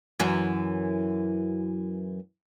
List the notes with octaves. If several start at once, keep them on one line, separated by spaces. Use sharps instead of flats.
F#2 E3 F#4